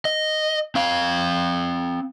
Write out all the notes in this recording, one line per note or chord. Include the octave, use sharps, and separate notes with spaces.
D#5
C4 F5